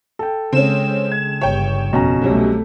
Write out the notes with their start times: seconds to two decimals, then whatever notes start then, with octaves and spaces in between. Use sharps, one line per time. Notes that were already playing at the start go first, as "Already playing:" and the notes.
0.19 A4 G5
0.53 C#3 G#3 C4 C#4 E7
1.11 G#6
1.41 G1 G2 C#5 G5
1.93 F2 B2 C#4 A#5
2.22 C2 C3 F#3 G3 A3